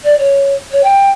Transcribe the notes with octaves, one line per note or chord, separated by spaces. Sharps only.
D5
C#5
C#5
G5